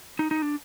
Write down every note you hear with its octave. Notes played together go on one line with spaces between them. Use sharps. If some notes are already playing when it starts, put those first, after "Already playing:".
D#4
D#4
D4